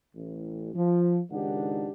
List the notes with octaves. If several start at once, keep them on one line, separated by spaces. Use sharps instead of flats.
A1
F3
C#2 G#2 D#3 D4 G4 F#5